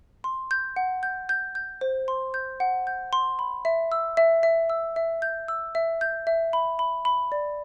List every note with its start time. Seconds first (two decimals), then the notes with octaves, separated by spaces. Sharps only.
0.24 C6
0.51 G6
0.76 F#5
1.03 G6
1.29 G6
1.55 G6
1.81 C5
2.08 C6
2.34 G6
2.60 F#5
2.87 G6
3.13 C6
3.39 B5
3.65 E5
3.92 E6
4.17 E5
4.43 E5
4.70 E6
4.96 E5
5.22 G6
5.48 E6
5.75 E5
6.01 G6
6.27 E5
6.53 B5
6.79 B5
7.05 B5
7.32 D5